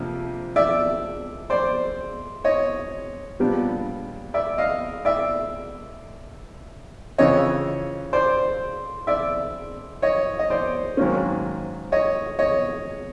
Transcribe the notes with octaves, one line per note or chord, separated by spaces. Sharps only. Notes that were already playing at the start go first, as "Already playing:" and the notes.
Already playing: F2 C3 F3 A#3 D4
D5 E5
C5 D5
C#5 D#5
A#2 G3 B3 D4
D5 E5
D#5 F5
D5 E5
F2 C#3 E3 C#5 D#5
C5 D5
D5 E5
C#5 D#5
D#5
C5 D5
G#2 D#3 F#3 A#3 C#4
C#5 D#5
C#5 D#5